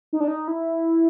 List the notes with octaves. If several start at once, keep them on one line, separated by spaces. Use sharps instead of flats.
D#4
D4
D#4
E4